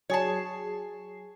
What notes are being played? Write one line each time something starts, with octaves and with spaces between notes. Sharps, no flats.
F#3 G#4 C#5 A5 C7